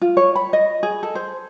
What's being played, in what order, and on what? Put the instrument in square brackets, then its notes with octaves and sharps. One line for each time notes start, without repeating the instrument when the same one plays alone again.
[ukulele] F4
C#5
B5
D#5
G#4
A4
C5